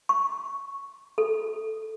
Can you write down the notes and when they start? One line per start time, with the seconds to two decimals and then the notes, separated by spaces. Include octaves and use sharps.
0.09 C#6
1.18 A4